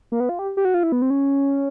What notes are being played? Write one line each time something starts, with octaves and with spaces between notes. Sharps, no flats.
A#3
B3
F4
G4
G4
F#4
F4
E4
B3
C4
C#4